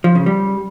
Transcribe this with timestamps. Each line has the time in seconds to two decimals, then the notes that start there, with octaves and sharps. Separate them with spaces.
0.04 F3
0.15 C#3
0.26 G3